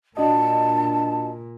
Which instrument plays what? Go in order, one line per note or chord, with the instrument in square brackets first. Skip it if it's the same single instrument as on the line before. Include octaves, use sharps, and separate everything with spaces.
[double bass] A#2 [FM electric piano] D4 F#4 D#5 [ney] A5